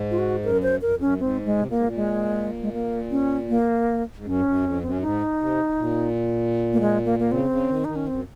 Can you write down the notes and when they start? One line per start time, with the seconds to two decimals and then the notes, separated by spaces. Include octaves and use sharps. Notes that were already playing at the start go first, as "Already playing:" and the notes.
Already playing: G#2
0.11 F4
0.18 F#4
0.43 F#2 A#4
0.62 C5
0.82 F#2 A#4
0.92 F2
1.00 F#2 C#4
1.20 G#2 C4
1.46 G#3
1.59 C3
1.66 A#2
1.70 A#3
1.76 G#2
1.84 A#2
1.96 G#3
2.62 G#3
2.73 A#3
3.11 C#4
3.49 A#3
4.16 G#2
4.25 F#2 C#4
4.39 G#2
4.45 F#2
4.63 F2
4.83 F#2 C4
4.92 C#4
5.02 G#2 D#4
5.40 C3
5.79 A#2
6.73 A#3
6.81 G#3
7.05 A#3
7.19 A#3
7.31 C#3 C4
7.50 C#3
7.69 D#3
7.85 D#3 D#4
7.96 C#4
8.07 F#2 C4